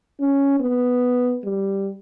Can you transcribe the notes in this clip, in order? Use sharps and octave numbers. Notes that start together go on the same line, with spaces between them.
C#4
B3
G3